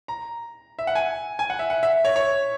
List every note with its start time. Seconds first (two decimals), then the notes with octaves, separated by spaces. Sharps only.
0.08 A#5
0.79 E5
0.87 F#5
0.95 G#5
1.39 G#5
1.50 F#5
1.59 E5
1.70 F#5
1.83 E5
2.05 C#5
2.16 C#5